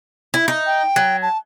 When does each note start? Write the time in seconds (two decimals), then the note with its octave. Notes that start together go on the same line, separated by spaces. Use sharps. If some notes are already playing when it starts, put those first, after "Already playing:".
0.34 E4
0.48 D#4
0.66 G5
0.96 F#3
1.22 A5